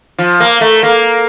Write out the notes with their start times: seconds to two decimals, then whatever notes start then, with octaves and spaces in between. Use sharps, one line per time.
0.18 F3
0.40 A#3
0.61 A3
0.83 A#3